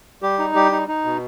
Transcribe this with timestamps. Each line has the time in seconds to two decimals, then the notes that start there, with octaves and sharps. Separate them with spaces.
0.22 G3 G4
0.39 D#4
0.55 G3 G4
0.72 D#4
0.88 D#4
1.05 B2